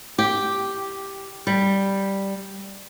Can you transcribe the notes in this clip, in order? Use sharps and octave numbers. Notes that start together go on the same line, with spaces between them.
G4
G3